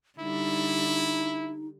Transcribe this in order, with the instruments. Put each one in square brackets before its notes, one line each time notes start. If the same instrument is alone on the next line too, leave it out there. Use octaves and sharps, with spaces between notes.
[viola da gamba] D3 G3 [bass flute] D#4 [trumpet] E4